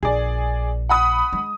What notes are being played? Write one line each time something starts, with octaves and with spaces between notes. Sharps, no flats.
A#1 G#4 D5
F#5 B5 D#6
G#3